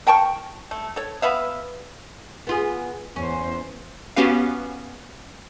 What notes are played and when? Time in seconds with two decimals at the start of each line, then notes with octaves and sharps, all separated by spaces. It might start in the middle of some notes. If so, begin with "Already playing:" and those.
0.07 A#4 G5 A5 C#6
0.71 A3
0.96 A4 C#5
1.22 B3 B4 E5 F5
2.47 B3 F4 G#4
3.16 E2 C#4 C5
4.16 B3 C#4 F#4 G4 B4 F5